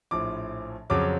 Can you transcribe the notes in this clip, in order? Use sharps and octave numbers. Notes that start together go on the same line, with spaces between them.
A#1 A2 F3 D6
F2 C#3 F#3 D6